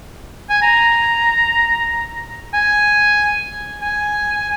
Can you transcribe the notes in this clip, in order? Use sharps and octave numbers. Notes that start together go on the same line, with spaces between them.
G#5
A#5
G#5
G#5